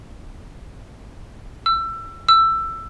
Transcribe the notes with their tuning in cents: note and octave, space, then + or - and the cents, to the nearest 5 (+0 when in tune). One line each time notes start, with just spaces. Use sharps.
E6 +25
E6 +15